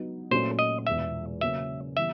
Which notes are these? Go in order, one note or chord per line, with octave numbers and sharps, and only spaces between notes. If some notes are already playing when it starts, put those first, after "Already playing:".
Already playing: F#3 B3 D#4
A#2 F#3 A3 C#4 C5
D#5
E2 B2 G#3 E5
C#3 F#3 A#3 C#4 E5
E3 G3 B3 E5